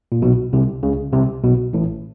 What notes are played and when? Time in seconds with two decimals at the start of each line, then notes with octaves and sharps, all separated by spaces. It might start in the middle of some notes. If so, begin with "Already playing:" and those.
0.12 A#2
0.22 B1 B2
0.53 C2 C3
0.83 C#2 C#3
1.13 C2 C3
1.43 B1 B2
1.73 A1 A2